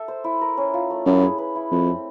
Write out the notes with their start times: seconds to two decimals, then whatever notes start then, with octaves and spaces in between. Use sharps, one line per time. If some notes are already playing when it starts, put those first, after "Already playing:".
Already playing: A4 E5
0.08 C5
0.24 E4
0.41 A#4
0.57 C#4
0.74 F4
0.90 A3
1.06 F#2 E4
1.22 G#4
1.38 B4
1.56 E4
1.71 F2 A3
1.87 C4